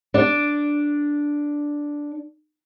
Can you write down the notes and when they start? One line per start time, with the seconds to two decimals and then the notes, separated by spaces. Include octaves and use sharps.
0.14 D4 D5